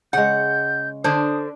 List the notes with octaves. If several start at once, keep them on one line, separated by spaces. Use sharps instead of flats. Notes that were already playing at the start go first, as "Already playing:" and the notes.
C#3 G#3 F#5 G6
D3 D4 C5 D#6